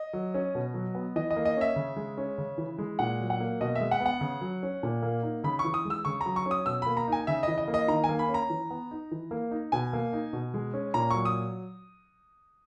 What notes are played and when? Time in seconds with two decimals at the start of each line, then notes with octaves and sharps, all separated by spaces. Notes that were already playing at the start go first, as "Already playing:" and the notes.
Already playing: D#5
0.13 F#3
0.34 C#4
0.55 B2
0.74 F#3
0.95 B3
1.16 E3 D#5
1.30 D#5
1.36 A#3
1.45 D#5
1.57 C#4 E5
1.76 C#3
1.96 G#3
2.18 C#4
2.38 C#3
2.58 E3
2.79 G#3
2.99 A#2 F#5
3.20 F#3
3.30 F#5
3.40 A#3
3.61 B2 D#5
3.75 G#3 E5
3.91 F#5
4.00 B3
4.06 F#5
4.21 C#3
4.41 F#3
4.63 C#4
4.83 A#2
5.02 A#3
5.23 D#4
5.44 C#3 B5
5.59 C#6
5.64 E3
5.74 D#6
5.85 G#3
5.90 E6
6.05 C#3 C#6
6.21 A#5
6.26 F#3
6.36 C#6
6.46 C#4
6.51 D#6
6.66 B2 E6
6.82 A#3 B5
6.97 A#5
7.08 D#4 G#5
7.27 C#3 E5
7.43 E3 D#5
7.58 D#5
7.68 A#3
7.74 D#5
7.88 D#3 A#5
8.04 G#5
8.09 A#3
8.19 B5
8.29 C#4
8.34 A#5
8.50 E3
8.71 B3
8.91 D#4
9.11 E3
9.31 A#3
9.51 D#4
9.72 B2 G#5
9.93 A#3
10.13 D#4
10.33 B2
10.54 G#3
10.74 C#4
10.94 A#2 A#5
11.11 F#3 C#6
11.25 D#6